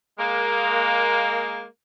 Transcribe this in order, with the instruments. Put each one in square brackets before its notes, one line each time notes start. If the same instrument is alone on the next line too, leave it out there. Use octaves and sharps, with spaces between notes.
[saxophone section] G#3 A#3